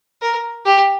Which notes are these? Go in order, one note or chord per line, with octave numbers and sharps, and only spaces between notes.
A#4
G4